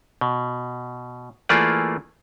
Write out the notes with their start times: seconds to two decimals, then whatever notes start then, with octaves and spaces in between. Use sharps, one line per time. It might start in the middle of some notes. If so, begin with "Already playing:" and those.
0.21 B2
1.49 E3 A3 A#3 F4 G#4 D5